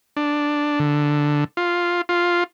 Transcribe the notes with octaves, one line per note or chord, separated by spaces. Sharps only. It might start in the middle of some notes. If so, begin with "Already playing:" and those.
D4
D3
F4
F4